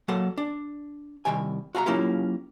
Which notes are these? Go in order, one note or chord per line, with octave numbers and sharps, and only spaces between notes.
F#3 A#3 A4 F#5 C6
D4
C2 F#2 D#3 G5 G#5
F#4 F5 G#5 A#5
F#3 A#3 C#4 E4 F4 G4